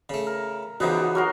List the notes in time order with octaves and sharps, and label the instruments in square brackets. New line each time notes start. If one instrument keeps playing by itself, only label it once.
[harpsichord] C#3 A3
[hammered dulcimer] A#4
[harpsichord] C#3 E3 F3 [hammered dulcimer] B3 D#4 G4 [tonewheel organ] F#4
[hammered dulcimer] F#3 A#4 C6